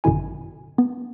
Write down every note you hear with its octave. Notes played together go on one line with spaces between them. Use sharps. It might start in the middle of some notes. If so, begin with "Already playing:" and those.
G#1 F#2 B2 D3 E4 G#5
B3